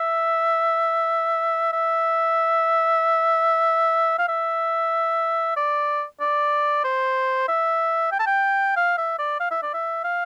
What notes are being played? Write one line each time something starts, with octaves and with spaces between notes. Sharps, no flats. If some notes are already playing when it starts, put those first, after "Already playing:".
Already playing: E5
E5
F5
E5
D5
D5
C5
E5
G5
A5
G5
F5
E5
D5
F5
E5
D5
E5
F5